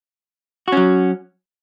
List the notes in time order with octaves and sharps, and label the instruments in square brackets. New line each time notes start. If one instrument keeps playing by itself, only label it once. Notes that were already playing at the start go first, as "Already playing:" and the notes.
[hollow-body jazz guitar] F#4
C#4
F#3